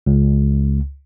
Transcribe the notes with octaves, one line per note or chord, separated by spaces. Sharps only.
C#2